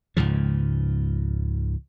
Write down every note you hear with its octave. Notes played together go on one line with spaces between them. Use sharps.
C#2 G#2 C#3 F3